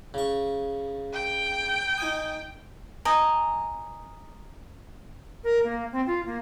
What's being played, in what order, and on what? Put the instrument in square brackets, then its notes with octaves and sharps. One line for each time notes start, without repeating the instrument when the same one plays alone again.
[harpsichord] C#3 C#6
[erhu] G5
[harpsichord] D#4 G#5 D#6
[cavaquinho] D#5 G#5 A#5
[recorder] A#4
A#3
C4
F4
A#3